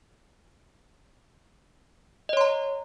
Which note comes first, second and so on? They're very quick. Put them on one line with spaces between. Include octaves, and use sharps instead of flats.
D#5 C#5 C6 A#5